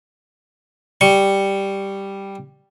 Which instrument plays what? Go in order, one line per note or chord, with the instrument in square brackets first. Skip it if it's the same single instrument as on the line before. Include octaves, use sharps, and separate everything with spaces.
[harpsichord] G3 C#6